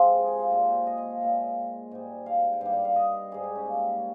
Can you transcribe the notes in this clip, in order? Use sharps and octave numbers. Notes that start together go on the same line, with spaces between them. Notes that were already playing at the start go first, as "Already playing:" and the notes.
Already playing: C3 F3 G#3 F4 C5
G#4
G5
F5
A#2 F3 G#3 D#5
C5
C#5
D#5
D#5
F5
A#2 G#3 F5
G#2 G3
F5
G5
G2 G3 F5
G5
F5
D#5
G#2 G3 G#4
G4
C#4
A#3